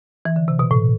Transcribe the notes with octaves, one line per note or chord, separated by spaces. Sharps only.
E3
D3
C3
B2
A2